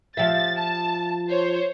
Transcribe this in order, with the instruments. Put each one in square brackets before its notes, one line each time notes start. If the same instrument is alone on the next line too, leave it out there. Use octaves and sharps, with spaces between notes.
[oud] F3 G4 E5 [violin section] A6
[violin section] A5
C5 C#5